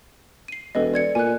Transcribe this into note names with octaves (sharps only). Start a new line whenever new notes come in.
C7 D#7
E1 A4 B4 D#5
D5 G#6 C#7
A#2 G#5 F#6